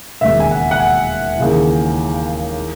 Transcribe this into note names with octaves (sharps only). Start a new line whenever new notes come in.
E1 D#2 C#3 E5
G#5
F#5
F#5
G#5
D#2 C#3 E3
E3